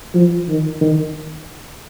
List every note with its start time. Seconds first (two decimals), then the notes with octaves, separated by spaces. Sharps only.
0.14 F3
0.48 D#3
0.81 D#3